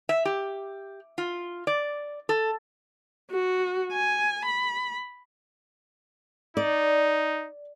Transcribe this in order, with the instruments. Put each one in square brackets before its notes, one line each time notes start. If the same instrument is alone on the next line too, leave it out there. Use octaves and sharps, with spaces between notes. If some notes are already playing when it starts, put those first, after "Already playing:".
[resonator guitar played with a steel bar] E5
G4
F4
D5
A4
[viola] F#4
G#5
B5
[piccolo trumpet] D#4 [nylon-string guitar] D5